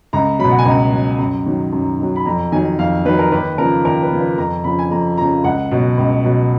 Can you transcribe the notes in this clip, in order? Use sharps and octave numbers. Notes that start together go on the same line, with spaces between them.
C#2 A#5
B2 F#3 B5
F#5
G#5
C#2 A#5
B2 F#3
F#2
D#3 F#3
F#2
D#3 F#3
B5
F2 A#5
D#3 F#3 G#5
F2 F5
D#3 F#3 B4
A#4
D#2 B4
C#3 F3 A#4
D#2 A#4
B4
C#3 F3
B4
F2 A#5
C#3 F3 B5
G#5
F2 A#5
C#3 F3 A#5
C#2 F#5
B2 F#3
C#2
B2 F#3